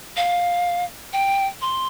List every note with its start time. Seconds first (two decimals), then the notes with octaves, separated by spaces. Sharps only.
0.16 F5
1.13 G5
1.61 C6